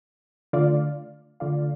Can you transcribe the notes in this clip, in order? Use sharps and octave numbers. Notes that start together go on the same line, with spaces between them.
D3 A3 F4 D5 F5
D3 A3 F4 D5 F5